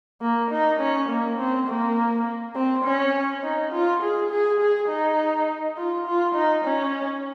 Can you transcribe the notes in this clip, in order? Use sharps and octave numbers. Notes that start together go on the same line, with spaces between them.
A#3
D#4
C#4
A#3
C4
A#3
C4
C#4
D#4
F4
G#4
G#4
G#4
D#4
F4
F4
D#4
C#4